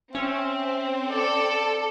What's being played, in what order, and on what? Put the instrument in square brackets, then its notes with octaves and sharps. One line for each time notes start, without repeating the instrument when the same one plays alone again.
[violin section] C4 [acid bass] C#4 [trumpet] E5
[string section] A4 [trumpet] D5